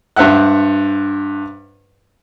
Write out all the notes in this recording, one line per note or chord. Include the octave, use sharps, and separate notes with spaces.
G2 C5 E5 F#5 F#6